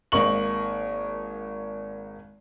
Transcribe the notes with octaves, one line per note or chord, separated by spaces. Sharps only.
G#1 A#3 A#4 D#5 C#6 F#7